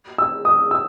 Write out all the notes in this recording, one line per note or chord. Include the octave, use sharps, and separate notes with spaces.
E6
D#6
E6